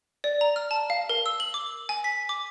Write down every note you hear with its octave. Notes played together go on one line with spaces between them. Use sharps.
D5
A#5
F6
A5
F5
A#4
E6
F#7
D6
G#5
B6
D6